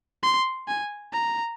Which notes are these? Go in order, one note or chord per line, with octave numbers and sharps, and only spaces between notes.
C6
G#5
A#5